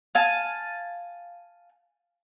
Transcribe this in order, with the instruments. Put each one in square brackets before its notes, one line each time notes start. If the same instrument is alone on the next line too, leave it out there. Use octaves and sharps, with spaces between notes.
[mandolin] F5 G#5 A5